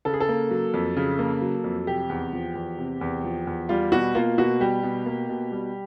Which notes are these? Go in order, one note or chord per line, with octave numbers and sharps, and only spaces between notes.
C#3 A4
G#4
A4
A#3
F#3
F2
C#3
A#3
F#3
F2
C3 G4
E2
F3
E2
C3
E2
F3
E2
G3 F4
B2 F#4
A#3 F4
B2 F#4
G3 G4
B2
A#3
B2
G3